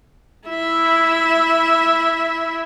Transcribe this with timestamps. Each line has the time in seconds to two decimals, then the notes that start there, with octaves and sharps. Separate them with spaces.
0.48 E4 E5